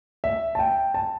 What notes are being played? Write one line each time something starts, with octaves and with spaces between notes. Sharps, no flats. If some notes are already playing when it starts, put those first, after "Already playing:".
E5
A5
G5
A5